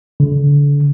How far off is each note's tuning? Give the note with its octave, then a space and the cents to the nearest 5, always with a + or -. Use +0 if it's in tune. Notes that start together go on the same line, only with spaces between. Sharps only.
D3 -35